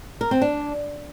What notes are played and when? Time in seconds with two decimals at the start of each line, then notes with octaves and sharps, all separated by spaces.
0.21 A#4
0.31 C4
0.42 D4